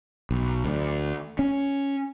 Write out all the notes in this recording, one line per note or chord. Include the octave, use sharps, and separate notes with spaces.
B1
D2
C#4